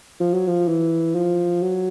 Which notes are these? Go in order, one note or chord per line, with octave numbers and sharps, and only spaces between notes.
F3
F#3
F3
E3
F3
F#3